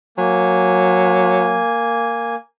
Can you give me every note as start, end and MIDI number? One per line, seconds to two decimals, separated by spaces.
0.18 1.63 54
0.18 2.35 58
0.18 2.35 80